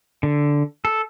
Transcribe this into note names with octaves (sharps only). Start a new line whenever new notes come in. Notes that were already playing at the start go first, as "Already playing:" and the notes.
D3
A4